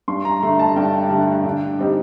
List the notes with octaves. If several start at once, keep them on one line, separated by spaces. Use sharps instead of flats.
G2 C6
A#5
D3 A3 C6
A5
G2 G5
D3 A3
D3
G3 C4 D#4